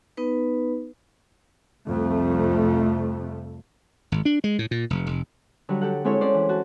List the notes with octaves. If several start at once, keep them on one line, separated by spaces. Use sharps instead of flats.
B3 D#4 B4
C2 F2 A3
G#1
D4
G#3
A2
A#2
F1
F1
D3 F#3 G3
G4 A4 F#5
G#3 C4 E4 A4 C#5
C#4 C5 D5
E3
F#4 A5